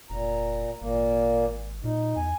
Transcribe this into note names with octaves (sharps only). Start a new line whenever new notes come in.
F1 A#2 A#5
G#1 A#2 A#3
A#2 D#4
E2 G#5